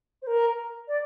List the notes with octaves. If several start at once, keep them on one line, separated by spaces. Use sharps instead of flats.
C5
A#4
D5